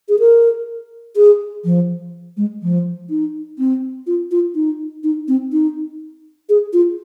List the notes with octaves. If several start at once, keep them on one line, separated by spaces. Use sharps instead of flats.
G#4
A#4
G#4
F3
G#3
F3
D#4
C4
F4
F4
D#4
D#4
C4
D#4
G#4
F4